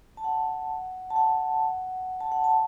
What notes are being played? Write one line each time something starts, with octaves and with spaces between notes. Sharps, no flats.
A5
F#5
A5
F#5
A5
F#5
A5